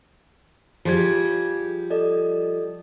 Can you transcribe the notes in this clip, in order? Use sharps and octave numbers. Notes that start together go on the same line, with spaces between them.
F3 G3 F4 G#4 G#6
A4 D5 D#5